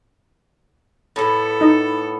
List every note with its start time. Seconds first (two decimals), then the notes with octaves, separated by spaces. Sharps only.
1.16 A2 B3 A4
1.61 D#4